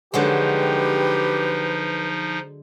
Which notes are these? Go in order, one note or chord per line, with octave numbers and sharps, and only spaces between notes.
D3 F3 F#3 G#3 D#4 G4 B4